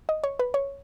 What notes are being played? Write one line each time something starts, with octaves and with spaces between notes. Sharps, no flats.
D#5
C#5
B4
C#5